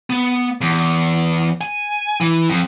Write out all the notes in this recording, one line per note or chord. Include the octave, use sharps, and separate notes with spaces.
B3
E2
G#5
E3
F2